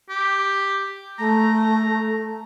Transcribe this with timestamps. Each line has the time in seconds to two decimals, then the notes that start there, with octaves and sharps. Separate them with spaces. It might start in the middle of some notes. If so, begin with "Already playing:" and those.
0.10 G4
1.19 A3 A#5